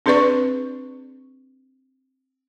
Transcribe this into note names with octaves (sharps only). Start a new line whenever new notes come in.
C4 D4 G#4 B4 D5 C#6